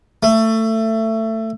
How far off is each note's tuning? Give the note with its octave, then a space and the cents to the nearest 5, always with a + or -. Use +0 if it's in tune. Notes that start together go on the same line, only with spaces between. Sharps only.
A3 +20